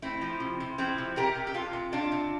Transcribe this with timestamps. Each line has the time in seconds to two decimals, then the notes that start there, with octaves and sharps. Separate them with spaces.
0.02 A3 C4 E4
0.21 F3
0.40 C3
0.60 C3
0.78 F3 C4 E4
0.98 C3
1.16 C3 G4 A#4
1.35 C3
1.47 G4
1.54 C3 F4 A4
1.73 C3
1.92 C3 D4 F4
2.12 C3